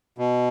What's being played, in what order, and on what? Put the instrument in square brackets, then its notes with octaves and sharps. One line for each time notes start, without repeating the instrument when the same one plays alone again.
[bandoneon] B2